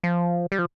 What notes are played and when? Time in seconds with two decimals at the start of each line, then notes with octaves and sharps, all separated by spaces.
0.04 F3
0.52 G3
0.59 F3